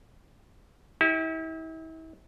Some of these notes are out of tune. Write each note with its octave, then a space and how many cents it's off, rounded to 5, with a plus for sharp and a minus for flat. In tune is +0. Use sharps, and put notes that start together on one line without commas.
E4 -40 G4 +0